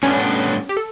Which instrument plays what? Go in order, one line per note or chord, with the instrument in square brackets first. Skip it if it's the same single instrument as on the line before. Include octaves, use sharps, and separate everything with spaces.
[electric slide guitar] A2 G3 B3 D4 [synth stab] C#4 C#5
[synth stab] G4
A4